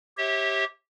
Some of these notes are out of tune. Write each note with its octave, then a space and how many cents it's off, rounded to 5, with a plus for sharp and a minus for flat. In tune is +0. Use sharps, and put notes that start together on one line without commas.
G4 -5 C#5 -35 E5 -25